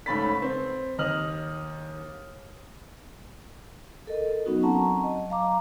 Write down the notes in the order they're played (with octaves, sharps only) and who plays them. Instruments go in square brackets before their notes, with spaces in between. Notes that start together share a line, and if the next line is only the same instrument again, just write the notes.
[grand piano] G#2 C#3 A3 B5 A6 B6
C4
D#2 D#5 D#6 F6 F#7
[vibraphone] A4 A#4 D#5
F#3 B3 C#4 D#4 F#4
F#3 C4 F#5 A5 A#5 C#6
D#5
F#3 F5 A#5 D6